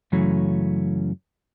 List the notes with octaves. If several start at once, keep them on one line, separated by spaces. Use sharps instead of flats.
F#2 C#3 E3 F#3 A3 C#4